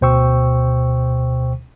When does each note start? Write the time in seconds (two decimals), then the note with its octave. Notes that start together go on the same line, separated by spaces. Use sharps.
0.01 D2 B2 C5 G5 C#6 E6